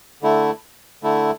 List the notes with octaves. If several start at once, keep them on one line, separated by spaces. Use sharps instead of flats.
D3 A3 E4
D3 A3 E4